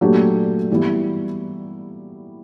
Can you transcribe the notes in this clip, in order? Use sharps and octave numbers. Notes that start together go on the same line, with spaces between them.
A#2 F#3 A3 D4 G4
E3 G3 B3 E4